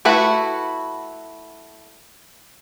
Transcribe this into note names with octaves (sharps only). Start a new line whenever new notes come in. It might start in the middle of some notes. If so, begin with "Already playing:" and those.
A3 E4 F#4 B4 B5